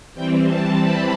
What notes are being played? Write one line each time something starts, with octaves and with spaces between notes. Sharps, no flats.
E3 G3 C4 G5
A5
B5